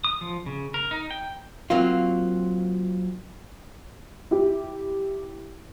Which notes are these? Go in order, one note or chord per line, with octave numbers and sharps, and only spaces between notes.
D#6
F3
C#3
A#4
D#4
G5
F#3 A#3 C4 F4
E4 G4